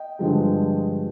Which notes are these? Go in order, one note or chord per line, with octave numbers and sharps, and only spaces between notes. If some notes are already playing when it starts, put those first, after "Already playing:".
Already playing: D#5 G5
G2 D3 F3 G#3